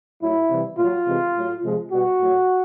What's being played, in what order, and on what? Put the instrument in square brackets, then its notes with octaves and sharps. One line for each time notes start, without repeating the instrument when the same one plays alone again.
[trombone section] A2 F#3 E4
C3 E3 G3
A#2 F4
F#3
C3 E3 G#3
A2 F#3
C3 F3 G#3
B2 G3 F#4
A2 F#3